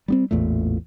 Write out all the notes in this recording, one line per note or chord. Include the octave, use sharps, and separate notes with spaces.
G3 B3 C4
A1 E2 A#2 A3